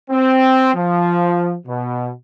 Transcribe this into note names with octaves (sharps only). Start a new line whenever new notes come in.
C4
F3
B2